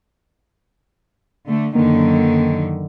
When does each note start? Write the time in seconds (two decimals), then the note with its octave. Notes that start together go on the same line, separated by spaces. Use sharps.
1.46 D3 A3
1.75 F#2 D3 D#3 A#3